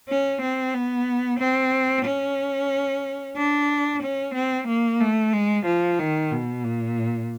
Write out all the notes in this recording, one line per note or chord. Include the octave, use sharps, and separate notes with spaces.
C#4
C4
B3
C4
C#4
D4
C#4
C4
A#3
A3
G#3
F3
D#3
B2
A#2